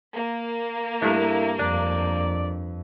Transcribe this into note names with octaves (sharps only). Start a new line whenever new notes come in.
A#3
G2 A3 D4 E4
F2 D4 D5